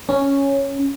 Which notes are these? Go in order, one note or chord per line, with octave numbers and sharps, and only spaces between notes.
C#4